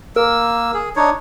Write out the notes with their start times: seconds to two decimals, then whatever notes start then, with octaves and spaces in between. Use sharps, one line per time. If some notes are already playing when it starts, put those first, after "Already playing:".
0.16 A#3 A#4 E6
0.74 G#4
0.96 D4 D#4 C#5